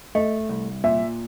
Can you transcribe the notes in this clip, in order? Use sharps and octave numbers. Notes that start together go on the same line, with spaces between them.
A3 D#5
C2
A#2 E5